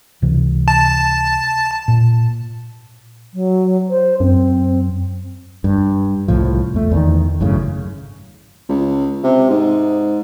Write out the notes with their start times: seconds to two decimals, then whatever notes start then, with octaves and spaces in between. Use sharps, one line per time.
0.22 C#2 C3 E3
0.68 A5
1.88 A#2
3.34 F#3
3.89 C5
4.20 F#2 C4
5.64 G2
6.28 C2 A2 F3
6.74 E2 A3
6.91 E2 D#3
7.40 G#1 F#2 A2 C#3
8.69 C#2
9.23 C3
9.49 G#2